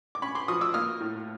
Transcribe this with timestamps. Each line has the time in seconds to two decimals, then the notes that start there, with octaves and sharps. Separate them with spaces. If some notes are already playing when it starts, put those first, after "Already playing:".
0.15 D6
0.22 C#4 B5 C#6
0.35 C6 D6
0.48 F3 C#6 D#6
0.61 D6 E6
0.74 A#3 D#6 F6
1.00 A2